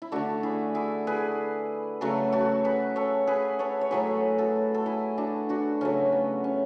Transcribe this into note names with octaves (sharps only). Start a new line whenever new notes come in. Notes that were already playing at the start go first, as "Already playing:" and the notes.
E4
D3 A3 D4 F#4
E4 G#4
E4 G#4
G#4 B4
C#3 F#3 A3 F#4 A4
F#4 A4
G#4 B4
A4 C#5
G#4 B4
A4 C#5
C#5
A2 F#3 A3 G#4 B4
F#4 A4
A4
E4 G#4
D4 F#4
D4 F#4
C#3 F#3 A3 C#4
B3
C#4